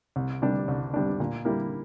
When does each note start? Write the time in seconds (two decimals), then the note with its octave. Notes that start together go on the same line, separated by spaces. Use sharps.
0.16 C2
0.42 C3 G3 D4
0.68 C2
0.94 C3 G3 D4
1.20 A#2
1.45 G3 A#3 E4